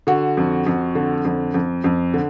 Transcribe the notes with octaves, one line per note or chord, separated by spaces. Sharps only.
D3 F#4
F2
F2
D3
F2
F2
F2
D3